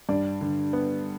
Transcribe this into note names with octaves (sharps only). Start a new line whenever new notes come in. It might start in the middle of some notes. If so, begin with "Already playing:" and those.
G2 D5
D3
B3